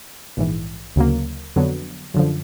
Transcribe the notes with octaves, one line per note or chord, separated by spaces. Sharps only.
A#1 G#2 E3
D2 C#3 F#3 A#3
F2 D3 F#3 B3
F#2 D3 F3